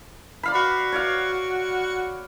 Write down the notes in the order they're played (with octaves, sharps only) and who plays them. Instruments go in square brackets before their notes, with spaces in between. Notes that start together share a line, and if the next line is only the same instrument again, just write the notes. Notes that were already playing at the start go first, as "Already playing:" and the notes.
[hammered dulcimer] D5 F5 B5
[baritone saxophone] F#4
[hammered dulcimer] C#5 D5 F5